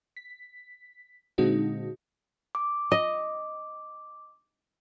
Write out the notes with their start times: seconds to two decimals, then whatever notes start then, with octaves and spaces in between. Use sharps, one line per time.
0.17 B6
1.38 A#2 D3 G#3 C4 D#4 F#4
2.55 D6
2.92 D#5